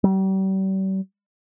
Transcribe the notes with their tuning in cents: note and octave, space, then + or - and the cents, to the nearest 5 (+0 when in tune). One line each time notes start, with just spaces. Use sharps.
G3 -40